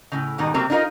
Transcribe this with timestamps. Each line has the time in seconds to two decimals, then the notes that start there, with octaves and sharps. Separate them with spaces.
0.12 A2 C#3
0.38 G#2 B2 D#3 G3
0.54 C3 F#3 A#3 C4
0.70 D4 D#4 F4 A#4 D#5